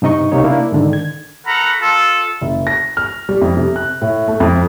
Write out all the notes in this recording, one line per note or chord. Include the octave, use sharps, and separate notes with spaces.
G2 C3 D#4 D#5 C#6
C2 C3 A#3 D#4 C#5
A#3 D4 E4
G#2 D3 D#3
G#6
F#4 A4 A#4 F#5 A#5 B5
F4 A4
F#1
A#6
F6
G3
F2
C3
F#6
A2
A3
F2